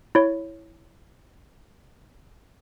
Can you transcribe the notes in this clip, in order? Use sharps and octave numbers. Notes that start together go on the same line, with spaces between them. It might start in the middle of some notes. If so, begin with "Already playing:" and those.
E4 C#5